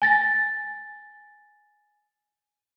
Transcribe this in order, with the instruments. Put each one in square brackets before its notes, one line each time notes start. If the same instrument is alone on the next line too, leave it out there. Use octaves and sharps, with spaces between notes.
[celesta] G#5 A6 A#6